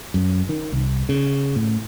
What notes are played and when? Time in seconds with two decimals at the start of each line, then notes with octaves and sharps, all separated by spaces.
0.14 F#2
0.49 D#3
0.72 C2
1.09 C#3
1.56 A2